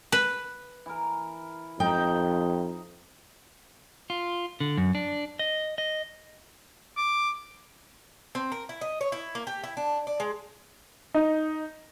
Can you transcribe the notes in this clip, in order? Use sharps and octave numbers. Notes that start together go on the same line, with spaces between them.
B4
E3 A#4
F2 D#4 G5
F4
D3
F#2
D4
D#5
D#5
D6
C4
A#4
E4
D#5
C#5
E4
A#3
G4
E4
D4
D5
G#3
D#4